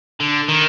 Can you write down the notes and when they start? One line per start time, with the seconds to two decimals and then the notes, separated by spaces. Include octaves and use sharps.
0.20 D3
0.49 D#3